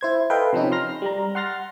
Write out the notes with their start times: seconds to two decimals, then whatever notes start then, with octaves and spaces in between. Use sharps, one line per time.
0.01 E4 C5 G#6
0.30 A4 B4 D#5 F5 G5 C6
0.53 C3 F3 C#4 D#4
0.72 C6 F6 A#6
1.02 G3 A#5
1.35 F#5 C6 F6 A6 A#6